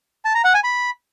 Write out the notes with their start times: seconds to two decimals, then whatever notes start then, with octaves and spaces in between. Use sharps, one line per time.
0.25 A5
0.35 A#5
0.44 F#5
0.54 G#5
0.64 B5